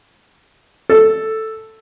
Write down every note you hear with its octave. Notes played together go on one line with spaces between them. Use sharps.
A4